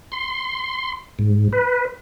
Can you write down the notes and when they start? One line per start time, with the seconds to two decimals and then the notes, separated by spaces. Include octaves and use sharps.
0.12 C6
1.19 G#2
1.53 B4